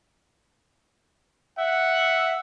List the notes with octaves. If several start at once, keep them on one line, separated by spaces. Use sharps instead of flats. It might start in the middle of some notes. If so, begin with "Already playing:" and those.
E5 F#5